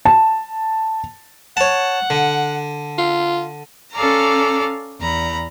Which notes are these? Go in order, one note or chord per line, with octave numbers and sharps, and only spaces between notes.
A5
C#5 F#5 A5
D3
F4
C#4 A4 D5 F5 A#5
E2 A#5 B5